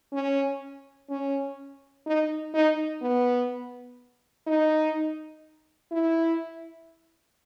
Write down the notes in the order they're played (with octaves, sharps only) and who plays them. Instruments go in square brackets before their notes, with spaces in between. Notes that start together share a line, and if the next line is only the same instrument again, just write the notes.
[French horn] C#4
C#4
D#4
D#4
B3
D#4
E4